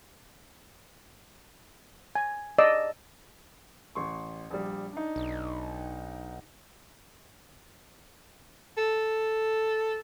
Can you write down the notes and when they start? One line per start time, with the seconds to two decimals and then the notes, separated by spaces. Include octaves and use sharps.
2.15 G#5
2.58 D5 D#5 E6
3.95 A1 C6 C#6
4.51 A#1 G3
4.93 D4 D#4
5.16 B1
8.77 A4